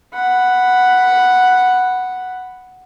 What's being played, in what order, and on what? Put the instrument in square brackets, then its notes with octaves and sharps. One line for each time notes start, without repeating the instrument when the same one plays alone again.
[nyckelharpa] F#5 B5